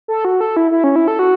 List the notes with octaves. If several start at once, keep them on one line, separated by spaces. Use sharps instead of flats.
A4
F#4
A4
E4
E4
C#4
E4
A4
F#4